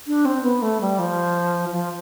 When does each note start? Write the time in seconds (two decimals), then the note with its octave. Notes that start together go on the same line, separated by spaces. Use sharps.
0.07 D4
0.25 C4
0.43 B3
0.62 A3
0.81 G3
0.99 F3
1.72 F3